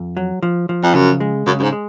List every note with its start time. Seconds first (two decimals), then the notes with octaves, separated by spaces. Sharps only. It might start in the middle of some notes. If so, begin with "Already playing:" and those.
Already playing: F2
0.17 F#3
0.43 F3
0.69 F3
0.83 F2
0.94 F#2 C#3
1.20 G#3
1.46 F#2 C#3
1.59 F#2
1.63 G#2
1.72 G#3